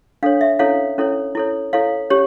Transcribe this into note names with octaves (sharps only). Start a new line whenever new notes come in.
D4 A4 C#5 F5
E5
C#4 E4 A4 C#5 F5
C#4 E4 A4 C#5
E4 A4 C#5
E4 A4 C#5 F5
C#4 G4 C#5